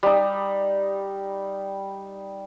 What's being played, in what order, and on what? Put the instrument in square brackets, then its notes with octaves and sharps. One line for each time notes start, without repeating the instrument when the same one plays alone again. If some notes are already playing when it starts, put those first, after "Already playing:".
[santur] G3 D#4